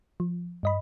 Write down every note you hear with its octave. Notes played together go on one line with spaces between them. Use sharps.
F3
G2 D#5 B5